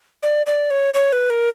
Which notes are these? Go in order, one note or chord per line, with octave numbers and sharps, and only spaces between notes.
D5
D5
C#5
C#5
B4
A#4